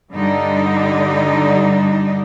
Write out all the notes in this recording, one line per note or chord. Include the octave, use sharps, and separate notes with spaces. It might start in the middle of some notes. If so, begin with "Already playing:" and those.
G2 D3 G3 D4 D#4